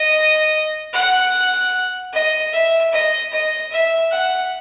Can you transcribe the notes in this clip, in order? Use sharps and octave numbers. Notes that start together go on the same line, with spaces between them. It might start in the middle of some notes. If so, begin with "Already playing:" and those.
Already playing: D#5
F#5
D#5
E5
D#5
D#5
E5
F#5